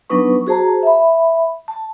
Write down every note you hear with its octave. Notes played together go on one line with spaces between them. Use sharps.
F#3 B3 D4 D#4 B4 C#6
F#4 G#4 C5 A5 A#5
E5 B5
A5